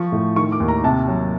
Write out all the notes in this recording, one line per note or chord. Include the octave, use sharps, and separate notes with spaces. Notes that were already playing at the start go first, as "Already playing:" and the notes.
Already playing: F3 C#6
A2
D#3 C#6
D6
D#2
A#5
C3 A5
F#3